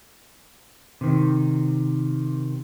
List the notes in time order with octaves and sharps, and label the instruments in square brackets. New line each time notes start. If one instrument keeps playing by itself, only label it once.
[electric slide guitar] C3 D#3